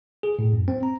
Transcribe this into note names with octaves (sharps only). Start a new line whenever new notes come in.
G#4
A2
F#2
C4
A#5